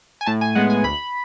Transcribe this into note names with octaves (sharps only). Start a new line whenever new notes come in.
G#5
A2 A5
G#5
G#3 B3 F#5
G#5
D2 B5